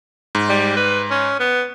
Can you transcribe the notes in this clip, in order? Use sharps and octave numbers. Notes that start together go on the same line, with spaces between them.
G#2
G3
B4
C#4
B3